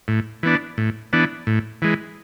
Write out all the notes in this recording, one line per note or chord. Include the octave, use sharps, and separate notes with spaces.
A2
E3 B3 D4
A2
E3 B3 D4
A2
E3 G#3